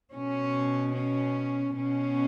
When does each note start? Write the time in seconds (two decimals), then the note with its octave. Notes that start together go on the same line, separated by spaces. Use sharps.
0.13 B2 C#4
0.94 C#4
1.76 B2 C#4